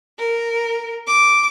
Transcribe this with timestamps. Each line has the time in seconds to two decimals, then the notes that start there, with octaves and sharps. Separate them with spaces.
0.19 A#4
1.07 D6